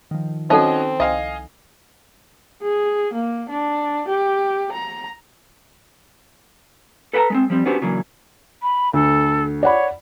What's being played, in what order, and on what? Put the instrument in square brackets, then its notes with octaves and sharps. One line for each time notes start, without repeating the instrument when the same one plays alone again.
[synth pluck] D#3 F3
[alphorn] C4 [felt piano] C#4 F#4 D#5 [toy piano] D#4 A4 F#5
[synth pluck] C2 [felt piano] D#5 F5 G#5
[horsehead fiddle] G#4
A#3
D4
G4
A#5
[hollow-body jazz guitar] A4 B4 F#5 G5 A5 A#5
G#3 B3 C4
F3 G3 C4
B3 C#4 D4 F#4 G4 C5
C#3 E3 F#3 A#3 D4
[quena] B5
[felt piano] D2 [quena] A4
[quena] C#5 [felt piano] D5 F#5 B5